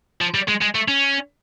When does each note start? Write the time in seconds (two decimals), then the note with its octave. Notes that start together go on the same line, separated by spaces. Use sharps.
0.21 F3
0.34 G3
0.48 G#3
0.62 G#3
0.75 A3
0.88 C#4